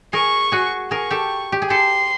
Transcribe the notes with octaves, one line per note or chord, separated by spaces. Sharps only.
G#4 A#4 C#6
F#4 G#4
G#4 A#4 C#6
G4 A4
G4
G#4
G4 A4 C6